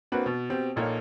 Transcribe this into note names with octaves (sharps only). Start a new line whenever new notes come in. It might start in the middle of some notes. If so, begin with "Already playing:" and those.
A#3 C4 D4 F#4 B4
B2 B3
B2 C4 G4
A#1 A#2 A#3 D#4 A4 C#5